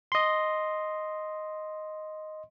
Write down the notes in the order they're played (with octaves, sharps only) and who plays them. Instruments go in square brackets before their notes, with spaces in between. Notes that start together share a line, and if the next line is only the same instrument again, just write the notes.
[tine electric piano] D#5 C6